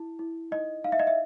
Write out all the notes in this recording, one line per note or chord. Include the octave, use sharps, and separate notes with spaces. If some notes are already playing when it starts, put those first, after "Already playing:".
Already playing: E4
E4
D#4 D#5
D#4 F5
E5
D#5
E5